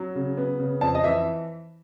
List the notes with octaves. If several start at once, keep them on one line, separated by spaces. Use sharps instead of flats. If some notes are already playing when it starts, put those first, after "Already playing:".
Already playing: F#3
C#3
B3
C#3
F2 A5
D#5
E3 E5